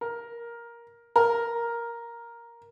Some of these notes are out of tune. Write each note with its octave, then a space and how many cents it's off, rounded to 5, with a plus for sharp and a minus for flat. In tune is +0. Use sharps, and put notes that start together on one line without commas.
A#4 +10
A#4 +5